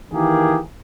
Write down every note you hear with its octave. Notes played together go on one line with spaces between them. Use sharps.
D#3 E3 A#3 G4 G#4